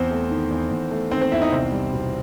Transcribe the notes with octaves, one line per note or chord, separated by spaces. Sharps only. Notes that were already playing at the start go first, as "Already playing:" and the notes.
Already playing: E2 C4 C5
A3
D#3
E2
E2
A3
D#3 C4 C5
C4 C5
E2 E4 E5
D#4 D#5
C2 C4 C5
G3
B2